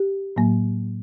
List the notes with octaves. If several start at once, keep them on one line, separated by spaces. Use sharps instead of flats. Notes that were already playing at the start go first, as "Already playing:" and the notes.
Already playing: G4
A2 F#3 A#3